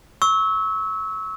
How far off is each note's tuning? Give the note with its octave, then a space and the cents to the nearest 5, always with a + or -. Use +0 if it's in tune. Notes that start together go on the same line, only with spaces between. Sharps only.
C#6 +0 E6 -25